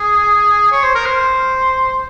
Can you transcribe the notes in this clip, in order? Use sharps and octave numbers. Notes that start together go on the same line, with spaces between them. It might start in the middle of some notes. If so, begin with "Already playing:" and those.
Already playing: G#4
C#5
C5
A#4
C5